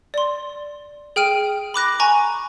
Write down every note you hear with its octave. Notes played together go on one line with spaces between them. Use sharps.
D5 C6
G#4 G5 F6 D7 D#7
B5 D6 F#6 A#6
G#5 A#5 C#6